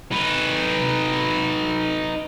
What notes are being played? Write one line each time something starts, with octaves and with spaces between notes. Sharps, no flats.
D#4 B4